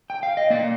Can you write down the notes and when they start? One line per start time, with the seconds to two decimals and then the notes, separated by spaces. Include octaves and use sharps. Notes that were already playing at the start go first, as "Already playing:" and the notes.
0.10 G5
0.23 F5
0.37 D#5
0.50 A#3 D5